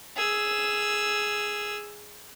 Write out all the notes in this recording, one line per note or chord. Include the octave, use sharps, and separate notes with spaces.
G#4 E6